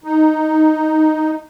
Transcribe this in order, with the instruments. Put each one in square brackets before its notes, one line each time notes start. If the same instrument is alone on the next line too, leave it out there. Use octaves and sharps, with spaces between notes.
[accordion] D#4